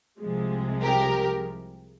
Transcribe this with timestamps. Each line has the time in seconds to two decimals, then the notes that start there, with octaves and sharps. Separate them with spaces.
0.20 C2 C3 F3 G#3
0.82 G4 A#4